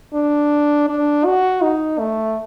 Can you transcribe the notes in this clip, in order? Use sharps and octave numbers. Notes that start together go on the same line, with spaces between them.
D4
D4
F#4
D#4
A3